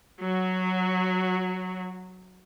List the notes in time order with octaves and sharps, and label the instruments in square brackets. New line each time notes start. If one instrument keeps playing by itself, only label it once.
[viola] F#3 F#4